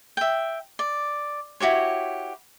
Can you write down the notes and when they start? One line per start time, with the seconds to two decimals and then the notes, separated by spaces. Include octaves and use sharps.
0.17 E5 G5
0.79 D5
1.60 E4 F#4 G4 C#5